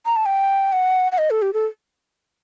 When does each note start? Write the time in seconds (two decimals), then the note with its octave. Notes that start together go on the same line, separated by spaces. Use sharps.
0.06 A#5
0.16 A5
0.26 G5
0.72 F#5
1.12 F#5
1.18 D#5
1.30 A4
1.42 G4
1.54 A4